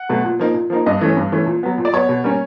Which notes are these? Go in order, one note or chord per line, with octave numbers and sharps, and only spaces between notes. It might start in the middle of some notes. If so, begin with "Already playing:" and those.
Already playing: F#5
B2 F#3 A3
A#2
F3 A#3 D#4
A#2
F3 A#3 D#4
G2 D#5
E3 A3 C#4
G2
E3 A3 C#4
A#2
F#3 B3
A#2
D5
F#3 B3 C#5
B2
G3 A#3 C#4